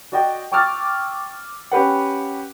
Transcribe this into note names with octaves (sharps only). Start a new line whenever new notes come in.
F#4 D5 D#5 F#5 G5
G5 C#6 D6 E6 F6 A6
C#4 G4 B4 F#5